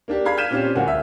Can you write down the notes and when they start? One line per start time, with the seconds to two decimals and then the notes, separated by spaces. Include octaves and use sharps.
0.08 A#3 D4 G4
0.25 G#4 F5 B5 G#6
0.37 F6 G6 G#6 B6 D#7 E7
0.50 A#2 C4 C#4 F4 G4
0.75 D1 C#2 A#3 F#5 G#5
0.88 E5